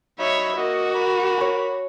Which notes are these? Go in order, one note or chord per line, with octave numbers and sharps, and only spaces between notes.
F#3 D#4 C#5 E5 B5
A#3 F#4 D#5
A#4 B5 D6
C#5 G#5